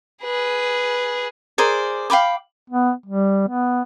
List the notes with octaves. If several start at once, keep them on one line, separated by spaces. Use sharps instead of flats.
G#4 B4
G#4 A#4 C5 D5
F5 G5 B5 D6
B3
G3
B3